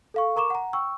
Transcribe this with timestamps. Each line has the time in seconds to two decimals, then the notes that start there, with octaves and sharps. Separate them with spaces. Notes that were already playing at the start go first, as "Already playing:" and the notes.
0.14 A4 F5 C#6
0.36 A#4 A#5 C#6 D6 E7
0.50 F#5 A#5
0.73 G5 C#6 E6